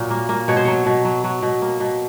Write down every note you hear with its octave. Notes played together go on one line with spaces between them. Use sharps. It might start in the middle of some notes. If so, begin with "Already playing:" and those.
Already playing: A#2 F#3
A#3
A#3
B2 C#5
C5
F#3 C#5
B2
F#3
F#3
B2
A#3
B2